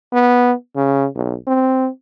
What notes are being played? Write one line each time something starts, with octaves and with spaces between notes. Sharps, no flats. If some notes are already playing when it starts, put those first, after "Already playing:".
B3
C#3
B1
C4